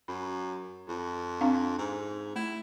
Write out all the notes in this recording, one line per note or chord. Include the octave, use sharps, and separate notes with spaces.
F#2 B5
F2
C4 D4 F5
G#2
A3 E4